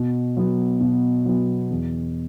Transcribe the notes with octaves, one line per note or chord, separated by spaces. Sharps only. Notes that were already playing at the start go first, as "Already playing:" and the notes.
Already playing: B2
F#3 B3
B2
F#3 B3
E2